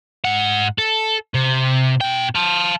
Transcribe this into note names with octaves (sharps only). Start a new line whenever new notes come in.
G#2 F#5
A4
C3
B2 G5
F5 A5